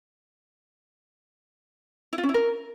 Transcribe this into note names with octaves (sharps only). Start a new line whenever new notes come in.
E4
F4
C#4
E4
A#4